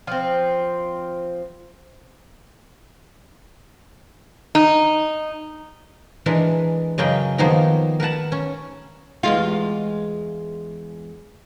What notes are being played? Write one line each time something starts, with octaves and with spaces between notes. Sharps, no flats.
F3 C4
D#4
E3 G#3 D4 A#4
F#2 C#3 A#4 D#5 G5
D#3 F3 A#3 B3 D#4 G#4
A#4 B4 F#5 A5
C#4
E2 G#3 F4